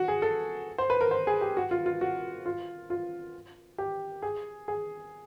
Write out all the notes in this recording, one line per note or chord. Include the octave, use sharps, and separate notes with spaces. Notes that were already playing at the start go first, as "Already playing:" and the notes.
Already playing: F#4
G#4
A4
C5
B4
A#4
C5
G#4
G4
F#4
F4
F4
F#4
F4
F4
G4
G#4
G#4